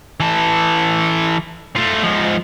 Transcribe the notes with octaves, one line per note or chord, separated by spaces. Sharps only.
E3 A4
A3 F4
G#2 F3